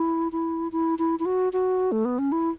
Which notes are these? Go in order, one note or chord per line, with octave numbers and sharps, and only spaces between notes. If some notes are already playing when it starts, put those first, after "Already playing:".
Already playing: E4
E4
E4
E4
E4
F#4
F#4
A3
B3
C#4
E4